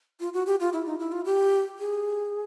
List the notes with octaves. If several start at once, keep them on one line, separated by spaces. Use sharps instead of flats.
F4
F#4
G4
F4
E4
D#4
E4
F4
G4
G#4